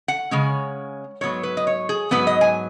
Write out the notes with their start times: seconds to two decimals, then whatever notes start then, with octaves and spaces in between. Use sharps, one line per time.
0.08 F#5
0.31 C#3 G#3 C#4
1.21 G#2 F#3 B3 C#5
1.43 B4
1.57 D#5
1.67 C#5
1.89 G#4
2.11 G#2 F#3 B3 B4
2.27 D#5
2.41 G#5